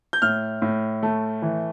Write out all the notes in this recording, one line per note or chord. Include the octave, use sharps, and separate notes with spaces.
G6
A2 F6
A2
A3
E3